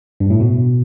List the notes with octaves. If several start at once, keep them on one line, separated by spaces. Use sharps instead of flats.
G2
A2
B2